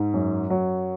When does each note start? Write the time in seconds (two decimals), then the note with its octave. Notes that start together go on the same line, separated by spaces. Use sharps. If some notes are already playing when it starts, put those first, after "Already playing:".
Already playing: G#2
0.14 F#2
0.50 F#3